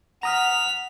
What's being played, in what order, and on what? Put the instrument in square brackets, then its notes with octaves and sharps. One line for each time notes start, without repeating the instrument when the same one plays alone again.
[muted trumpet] F#5 [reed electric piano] A#5 D#6 F6 [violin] B6 F7